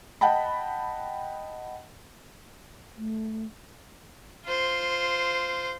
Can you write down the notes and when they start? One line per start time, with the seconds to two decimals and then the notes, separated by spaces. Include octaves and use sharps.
0.21 D#5 F#5 G5 A5 B5
2.97 A3
4.46 F4 C5